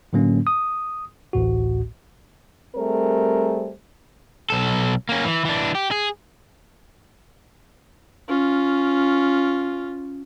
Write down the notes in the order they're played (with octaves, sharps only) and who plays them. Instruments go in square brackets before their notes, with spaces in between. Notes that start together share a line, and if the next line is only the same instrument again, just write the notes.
[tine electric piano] A2 D3 F#3 A#3 C#4
D#6
A1 D2 A2 F#4
[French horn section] G3 A3 C4 G#4 A#4 C5
[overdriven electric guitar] B1 A4
A#3 C#4
E3
E3 D4
G4
G#4
[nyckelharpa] C#4 F4